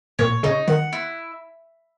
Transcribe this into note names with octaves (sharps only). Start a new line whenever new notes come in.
A#2 C#5
C#3 D#4
D#3 F#5
E4